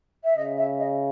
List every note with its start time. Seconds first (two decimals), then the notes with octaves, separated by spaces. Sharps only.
0.24 E5
0.36 C#3 D#5
0.57 E5
0.78 D#5